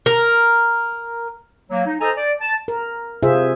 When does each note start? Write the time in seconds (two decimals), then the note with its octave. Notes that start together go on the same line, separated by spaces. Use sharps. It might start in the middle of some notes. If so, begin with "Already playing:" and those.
0.06 A#4
1.70 F#3 A#3
1.86 D#4
2.00 A4 C5 D#5 G#5 A#5
2.16 D5
2.41 A5
2.68 A#4
3.23 C3 F4 G#4 C5 E5